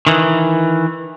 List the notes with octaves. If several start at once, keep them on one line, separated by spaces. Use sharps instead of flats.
D#3 E3